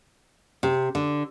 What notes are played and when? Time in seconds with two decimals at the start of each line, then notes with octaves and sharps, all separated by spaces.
0.63 C3
0.95 D3